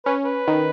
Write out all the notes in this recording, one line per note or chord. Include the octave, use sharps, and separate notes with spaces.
C#4 B4
B4
D#3